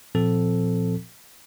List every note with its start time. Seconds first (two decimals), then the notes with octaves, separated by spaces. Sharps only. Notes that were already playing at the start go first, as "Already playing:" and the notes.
0.15 A#2 F3 C4 A4